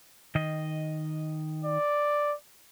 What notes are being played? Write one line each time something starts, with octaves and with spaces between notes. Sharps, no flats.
D#3 D#5
D5